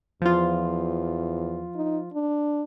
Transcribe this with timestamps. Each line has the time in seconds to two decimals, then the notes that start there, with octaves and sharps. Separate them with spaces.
0.22 E2 F3 F4
1.75 D#4
2.14 D4